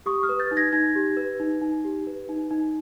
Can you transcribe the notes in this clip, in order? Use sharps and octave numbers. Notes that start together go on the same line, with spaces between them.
G4 C#6 D#6
D#6 F6
B4
G6 A6
D#4
G#6 A#6
D#4 G#6 A#6
G4
B4
D#4
D#4
G4
B4
D#4
D#4